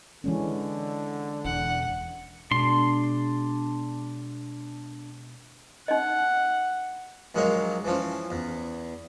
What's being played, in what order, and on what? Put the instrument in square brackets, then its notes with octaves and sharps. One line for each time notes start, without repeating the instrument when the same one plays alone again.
[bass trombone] D3 [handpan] E3 G#3 C#4
[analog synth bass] E1 [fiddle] F#5
[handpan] B2 G#3 [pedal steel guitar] D4 C6
[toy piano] D#4 D#5 [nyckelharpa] F#5
[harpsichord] A#1 F#3 G#3 A#3 A#4 C#5
E3 F3 C#4
E2